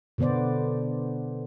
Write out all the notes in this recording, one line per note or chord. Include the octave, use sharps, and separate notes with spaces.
B2 D3 B3 C5 D5